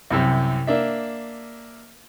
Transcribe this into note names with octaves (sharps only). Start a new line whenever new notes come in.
C2 F#2 C3
A#3 D4 E5